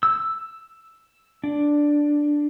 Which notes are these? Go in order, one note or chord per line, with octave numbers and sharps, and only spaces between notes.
E6
D4